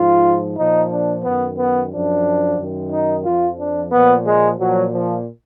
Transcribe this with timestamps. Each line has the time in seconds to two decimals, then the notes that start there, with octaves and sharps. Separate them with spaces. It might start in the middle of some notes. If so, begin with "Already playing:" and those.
Already playing: G#2 F3 F4
0.57 A#2 F3 D#4
0.91 D4
1.24 F#2 D#3 B3
1.58 B3
1.92 F#2 F3 D4
2.58 F#2 D#3
2.92 D#4
3.25 F2 F3 F4
3.60 D4
3.92 A#2 F3 B3
4.26 G#3
4.59 A#2 F3 F#3
4.93 F3